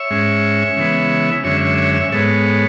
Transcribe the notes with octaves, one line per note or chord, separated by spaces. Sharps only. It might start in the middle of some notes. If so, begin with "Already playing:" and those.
Already playing: C#5 E5
G#2 G#3 C#4
C#3 E3 G#3 B3
F#2 D3 G#3 C#4 C#5 E5
C#5 E5
C#5 E5
C#5 E5
G#2 G#3 B3 A4 C#5